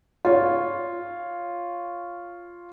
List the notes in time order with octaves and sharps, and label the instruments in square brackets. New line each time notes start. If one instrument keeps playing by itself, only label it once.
[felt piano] F4 C#5